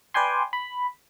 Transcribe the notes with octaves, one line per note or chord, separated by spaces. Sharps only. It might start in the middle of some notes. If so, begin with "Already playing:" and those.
B4 D5 G5 G#5 C6
B5